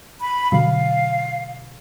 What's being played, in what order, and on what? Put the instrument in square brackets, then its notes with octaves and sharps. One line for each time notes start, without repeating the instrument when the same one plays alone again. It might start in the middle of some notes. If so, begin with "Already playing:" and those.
[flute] B5
[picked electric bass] B2 D3 F#3 [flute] F5